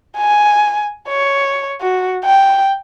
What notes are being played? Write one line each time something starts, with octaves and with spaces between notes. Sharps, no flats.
G#5
C#5
F#4
G5